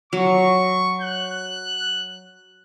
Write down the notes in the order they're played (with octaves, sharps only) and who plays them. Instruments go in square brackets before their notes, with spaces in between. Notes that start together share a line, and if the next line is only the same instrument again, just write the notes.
[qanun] F#3 [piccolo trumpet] C#6
[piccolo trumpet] F#6